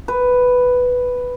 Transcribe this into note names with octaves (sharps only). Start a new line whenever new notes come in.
B4